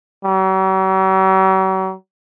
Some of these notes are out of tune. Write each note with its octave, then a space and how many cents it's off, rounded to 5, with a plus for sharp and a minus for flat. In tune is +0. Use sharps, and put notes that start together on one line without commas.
F#3 +45